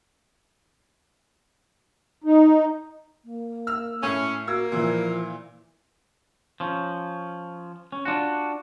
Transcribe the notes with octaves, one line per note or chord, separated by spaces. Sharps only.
D#4
A#3
E6 F6
A2 C#4
A#3 F#4 E6 G#6
A#2 E3 F3
F3 C#4
C#4
D4 F4 F#4